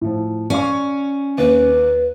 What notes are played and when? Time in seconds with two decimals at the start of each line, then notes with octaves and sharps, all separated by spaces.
0.01 A2 F3
0.50 C#4 D5 F5 C#6
1.38 D#2 B4